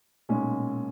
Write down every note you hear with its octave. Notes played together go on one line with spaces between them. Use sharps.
B1 A#2 G#3 C#4